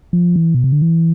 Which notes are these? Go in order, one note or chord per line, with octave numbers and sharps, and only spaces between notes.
F3
E3
B2
C3
D3
E3